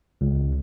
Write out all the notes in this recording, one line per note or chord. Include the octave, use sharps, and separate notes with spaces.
C#2